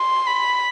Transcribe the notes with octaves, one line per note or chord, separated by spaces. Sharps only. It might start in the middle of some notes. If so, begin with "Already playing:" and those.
Already playing: C6
B5